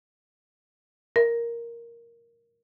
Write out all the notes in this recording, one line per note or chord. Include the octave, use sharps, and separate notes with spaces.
A#4